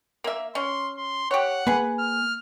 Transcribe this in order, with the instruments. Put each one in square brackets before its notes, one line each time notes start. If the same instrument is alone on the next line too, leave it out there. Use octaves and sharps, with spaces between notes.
[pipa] A#3 E5
[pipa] C#4 [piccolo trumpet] C6
[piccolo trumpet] C6
[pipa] G4 C#5 [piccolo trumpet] F#5
[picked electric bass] A#3 [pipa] G#4 B4
[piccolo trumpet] F6